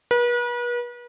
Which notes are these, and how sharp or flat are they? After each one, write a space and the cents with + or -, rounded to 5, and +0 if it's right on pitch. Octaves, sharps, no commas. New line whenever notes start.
B4 -40